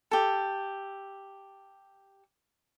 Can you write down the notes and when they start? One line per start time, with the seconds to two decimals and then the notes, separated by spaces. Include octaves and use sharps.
0.11 G4 A4